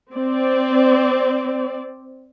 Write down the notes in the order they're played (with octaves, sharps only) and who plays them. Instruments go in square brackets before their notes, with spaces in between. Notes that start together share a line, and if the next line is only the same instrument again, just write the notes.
[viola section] C4 D5